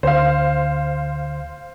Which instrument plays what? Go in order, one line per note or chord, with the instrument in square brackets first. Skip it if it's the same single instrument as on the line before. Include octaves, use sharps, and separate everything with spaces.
[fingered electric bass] D2 [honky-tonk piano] C5 F5